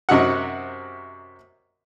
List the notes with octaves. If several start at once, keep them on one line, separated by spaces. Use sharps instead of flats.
F#2 C3 D#4 F#4 F#5